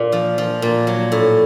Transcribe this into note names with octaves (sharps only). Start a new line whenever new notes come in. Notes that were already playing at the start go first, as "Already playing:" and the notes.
Already playing: A#2
F3
F3
A#2
F#3
A2